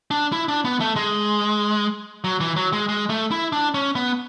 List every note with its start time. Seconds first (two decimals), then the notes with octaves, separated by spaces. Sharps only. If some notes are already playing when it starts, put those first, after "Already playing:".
0.11 D4
0.32 E4
0.48 D4
0.65 B3
0.80 A3
0.96 G#3
2.24 F#3
2.41 E3
2.56 F#3
2.73 G#3
2.89 G#3
3.10 A3
3.31 E4
3.52 D4
3.74 C#4
3.95 B3